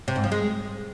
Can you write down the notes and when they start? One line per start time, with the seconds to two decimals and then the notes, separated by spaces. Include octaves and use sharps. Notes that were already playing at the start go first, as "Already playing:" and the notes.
0.08 C3
0.16 G#2
0.24 F3
0.32 G#3